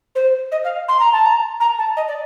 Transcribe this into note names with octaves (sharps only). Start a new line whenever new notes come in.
C5
D#5
F5
C6
A#5
A5
A#5
A#5
A5
D#5
D5